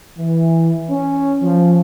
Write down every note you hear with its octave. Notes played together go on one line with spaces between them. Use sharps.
E3
C#4
F3